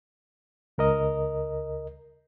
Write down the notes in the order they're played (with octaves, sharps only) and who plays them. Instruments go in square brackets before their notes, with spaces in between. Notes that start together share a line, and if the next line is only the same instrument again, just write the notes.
[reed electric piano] C#2 A#4 D#5